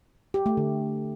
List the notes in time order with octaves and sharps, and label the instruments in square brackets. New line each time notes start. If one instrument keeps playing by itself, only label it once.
[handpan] G4
A3
D3